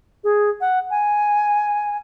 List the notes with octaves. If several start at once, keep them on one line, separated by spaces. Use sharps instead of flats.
G#4
F#5
G#5